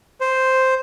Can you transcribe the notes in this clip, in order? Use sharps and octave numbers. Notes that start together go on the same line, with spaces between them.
C5